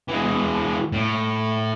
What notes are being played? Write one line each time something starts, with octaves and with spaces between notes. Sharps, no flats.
E3 G#3
A2